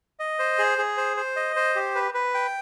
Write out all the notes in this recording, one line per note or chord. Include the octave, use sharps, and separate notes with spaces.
D#5
C5
G#4
G#4
C5
C5
D#5
C5
G4
B4
B4
G5